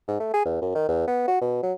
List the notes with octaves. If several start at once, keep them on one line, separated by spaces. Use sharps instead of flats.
G#2
A3
G#4
E2
F#2
D#3
E2
B3
F#4
B2
F#3